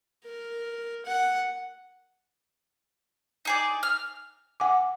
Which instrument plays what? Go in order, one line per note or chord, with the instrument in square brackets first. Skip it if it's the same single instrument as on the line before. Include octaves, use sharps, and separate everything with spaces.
[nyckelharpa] A#4
F#5
[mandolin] D#4 G#4 D5
F6
[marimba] F#5 G#5 D6